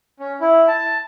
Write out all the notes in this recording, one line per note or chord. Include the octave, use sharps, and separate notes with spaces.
C#4
E4
A5